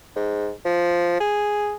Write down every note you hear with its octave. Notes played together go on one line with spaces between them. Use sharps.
G#2
F3
G#4